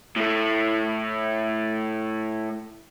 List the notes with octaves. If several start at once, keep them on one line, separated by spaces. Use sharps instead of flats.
A2 A3